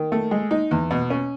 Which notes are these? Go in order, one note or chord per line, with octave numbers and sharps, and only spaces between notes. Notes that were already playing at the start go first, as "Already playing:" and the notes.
Already playing: D#3
A3
G#3
D#4
E2
B2
C#4